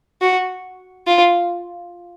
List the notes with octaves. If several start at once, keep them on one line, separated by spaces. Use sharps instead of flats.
F#4
F4